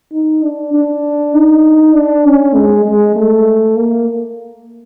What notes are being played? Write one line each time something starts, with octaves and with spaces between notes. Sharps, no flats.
D#4
D4
D4
D#4
D4
C#4
G#3
G#3
A3
A#3